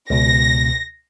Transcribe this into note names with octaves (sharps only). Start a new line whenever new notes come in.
C#2 B2 A#6